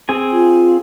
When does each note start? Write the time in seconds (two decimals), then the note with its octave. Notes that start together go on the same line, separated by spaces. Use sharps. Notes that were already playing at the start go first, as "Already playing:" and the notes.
0.09 C4 G#4 G#5
0.31 F4